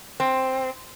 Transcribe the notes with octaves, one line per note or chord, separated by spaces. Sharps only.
C4